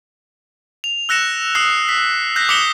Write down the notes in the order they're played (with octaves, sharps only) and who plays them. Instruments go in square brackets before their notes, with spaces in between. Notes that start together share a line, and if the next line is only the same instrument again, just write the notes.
[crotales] F7
E6 F#6 A#6 C#7 E7
D#6 E6 F#6 C7
B6
F#6 G6 A#6 B6
D6 D#6 B6 C#7 E7 G7